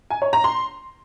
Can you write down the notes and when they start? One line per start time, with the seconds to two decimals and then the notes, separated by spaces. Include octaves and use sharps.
0.10 G#5
0.22 C#5
0.33 A#5
0.44 C6